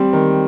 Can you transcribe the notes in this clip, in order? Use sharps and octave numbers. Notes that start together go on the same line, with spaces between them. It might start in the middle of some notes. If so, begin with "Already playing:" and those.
Already playing: G3 C4
D#3